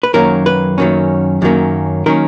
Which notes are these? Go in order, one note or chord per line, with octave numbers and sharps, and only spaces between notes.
B4
F#2 D#3 F#3 A#3 C#4 A#4
B4
F#2 D#3 F#3 A#3 C#4
F#2 D#3 F#3 A#3 C#4
D#3 F#3 A#3 C#4 A#4